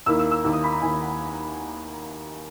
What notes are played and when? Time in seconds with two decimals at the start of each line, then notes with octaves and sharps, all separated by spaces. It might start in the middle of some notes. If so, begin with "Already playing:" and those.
0.06 D#2 D#3 A#3 E4 E6
0.19 E6
0.31 E6
0.44 D#2 D#3 A#3 E4 E6
0.53 D#6
0.64 B5
0.72 A#5
0.82 D#2 D#3 A#3 E4 G#5
1.02 F#5